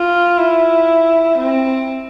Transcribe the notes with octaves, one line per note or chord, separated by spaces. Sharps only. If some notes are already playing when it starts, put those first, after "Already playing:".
Already playing: F4
E4
C4